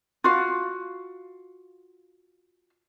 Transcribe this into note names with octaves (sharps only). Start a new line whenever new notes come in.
F4 F#4 F5